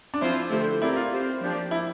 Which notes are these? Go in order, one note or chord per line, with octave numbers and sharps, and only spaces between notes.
D4
F3 C4 E4 F4 C5
D3 A3 E4 G4 C5
C4 E4 G4 A#4 D5
F4
C4 G4 C5
F3 A#3 D4 G4 D5
E4